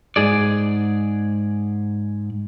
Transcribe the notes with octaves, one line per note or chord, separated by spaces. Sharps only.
G#2 G#4 D5